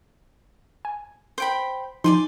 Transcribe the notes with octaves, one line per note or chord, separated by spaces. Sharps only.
G#5
C5 G5 B5
F3 D#4 D5 G#5 C6